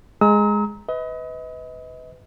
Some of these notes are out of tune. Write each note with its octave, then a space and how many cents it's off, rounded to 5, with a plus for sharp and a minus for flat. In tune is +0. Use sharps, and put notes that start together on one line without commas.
G#3 +0 A#5 +0 E6 -45
B4 +20 D#5 +35